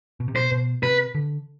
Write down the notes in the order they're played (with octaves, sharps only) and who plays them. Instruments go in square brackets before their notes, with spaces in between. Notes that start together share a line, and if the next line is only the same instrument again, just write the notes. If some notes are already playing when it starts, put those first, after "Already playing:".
[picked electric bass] B2
C3
[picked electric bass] B2 [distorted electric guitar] C5
[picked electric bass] B2
[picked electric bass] C3 [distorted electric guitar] B4
[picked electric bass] D3